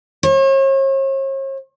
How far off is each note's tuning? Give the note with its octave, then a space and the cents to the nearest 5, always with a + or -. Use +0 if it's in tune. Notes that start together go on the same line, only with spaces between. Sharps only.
C#5 -45